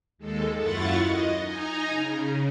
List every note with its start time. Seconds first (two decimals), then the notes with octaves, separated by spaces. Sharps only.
0.18 D#2 G#3 A4
0.58 F#2 E4 F4 F#5 C#6 A6
1.01 D#5
1.40 D#4 G#5 A#5
1.88 C#3